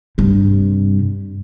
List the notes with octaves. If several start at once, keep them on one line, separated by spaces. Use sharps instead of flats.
G2 C3